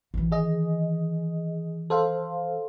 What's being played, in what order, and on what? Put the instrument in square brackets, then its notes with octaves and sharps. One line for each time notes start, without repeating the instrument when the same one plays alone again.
[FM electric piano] A1 [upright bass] D#3 E3
[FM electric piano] G#4 D#5
A4 C5 F5